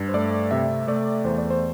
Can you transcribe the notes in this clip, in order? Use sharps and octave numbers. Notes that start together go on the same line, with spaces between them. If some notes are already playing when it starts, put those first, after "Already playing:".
Already playing: G2
C5
A3 D5
C3 E5
A3 D5
E2 C5
D5
C5